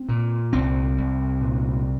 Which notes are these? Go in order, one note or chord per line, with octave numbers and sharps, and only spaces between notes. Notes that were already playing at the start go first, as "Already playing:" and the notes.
Already playing: C4
A#2
C2 C4
C2
A#2